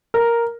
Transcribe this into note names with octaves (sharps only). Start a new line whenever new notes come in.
A#4